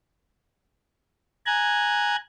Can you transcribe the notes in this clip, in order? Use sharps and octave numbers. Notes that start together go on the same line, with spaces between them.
G#5 A#5 F#6 G#6